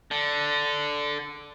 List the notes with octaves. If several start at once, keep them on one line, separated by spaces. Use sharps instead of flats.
D3